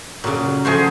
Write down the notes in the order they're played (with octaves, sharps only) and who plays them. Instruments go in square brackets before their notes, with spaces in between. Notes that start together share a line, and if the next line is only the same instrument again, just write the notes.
[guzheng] A#2 C#3 [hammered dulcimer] F#3
[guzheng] F3 A3 F#4 [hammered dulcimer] G#4 C5